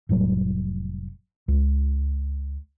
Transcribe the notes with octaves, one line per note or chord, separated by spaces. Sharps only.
F1 A2 F#3 G3
C#2